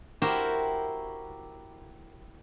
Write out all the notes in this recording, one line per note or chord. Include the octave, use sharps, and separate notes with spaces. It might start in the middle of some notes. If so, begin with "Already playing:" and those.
E4 F#4 G4 A#4 C5